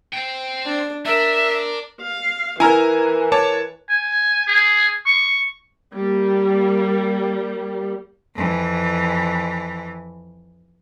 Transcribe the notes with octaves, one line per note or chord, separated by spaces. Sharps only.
C5 G5
D4
D4 A#4 E5
F5
E3 E4 A#4 G#5 A#5 F6
C#5 A5 D6
G#5
G#4
C#6
G3 A#3
F2 E3